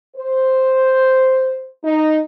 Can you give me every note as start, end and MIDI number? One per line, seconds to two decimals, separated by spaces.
0.16 1.73 72
1.84 2.20 63